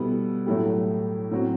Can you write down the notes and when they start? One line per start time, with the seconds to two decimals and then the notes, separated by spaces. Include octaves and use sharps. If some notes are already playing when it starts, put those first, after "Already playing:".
Already playing: B2 G3 B3 E4 A4
0.46 A2 F#3 A3 E4 G4
1.31 A2 F#3 C4 F#4